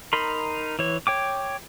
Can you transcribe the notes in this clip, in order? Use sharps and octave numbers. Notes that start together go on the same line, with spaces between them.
D#4 A#4 B5 C6
E3 C#5
C#5 G5 D6